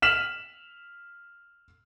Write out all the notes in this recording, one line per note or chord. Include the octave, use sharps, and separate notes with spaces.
F6 B6 E7 F#7